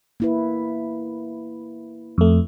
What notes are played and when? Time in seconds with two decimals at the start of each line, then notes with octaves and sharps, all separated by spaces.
0.20 A#3 E4 B4
2.18 F2 A3